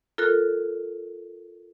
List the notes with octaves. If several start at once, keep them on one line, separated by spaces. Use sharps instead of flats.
F4 A4 A#4 F#6